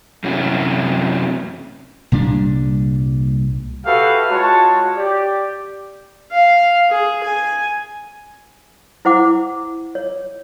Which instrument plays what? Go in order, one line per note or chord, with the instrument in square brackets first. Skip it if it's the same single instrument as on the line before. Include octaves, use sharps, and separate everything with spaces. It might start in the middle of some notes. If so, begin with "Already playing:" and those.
[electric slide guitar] F#2 C3 C#4 E4 F#4
[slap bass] C2 A#2 G3 D4
[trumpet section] F#4 G4 A4 B4 E5 F5
G#3 F4 F#4 C#5 A5
G4 D5
[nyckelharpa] F5
G#4
G#5
[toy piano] E4 C5 F#5 D6
C#5